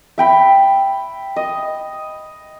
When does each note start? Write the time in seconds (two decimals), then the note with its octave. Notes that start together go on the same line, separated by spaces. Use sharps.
0.18 E5 G5 B5
1.36 D#5